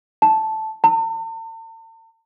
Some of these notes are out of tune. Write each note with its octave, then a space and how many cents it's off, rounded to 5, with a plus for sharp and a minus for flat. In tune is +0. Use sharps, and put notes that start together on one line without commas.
A5 -5
A5 +45